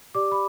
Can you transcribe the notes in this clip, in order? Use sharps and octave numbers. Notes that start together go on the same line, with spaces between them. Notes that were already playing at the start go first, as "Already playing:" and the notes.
G4 D5 D6
B5